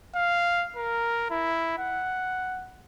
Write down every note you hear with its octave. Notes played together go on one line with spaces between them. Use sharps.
F5
A#4
E4
F#5